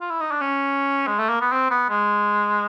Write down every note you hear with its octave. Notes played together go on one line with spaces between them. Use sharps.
F4
E4
D#4
D4
C#4
G#3
A3
A#3
B3
C4
B3
G#3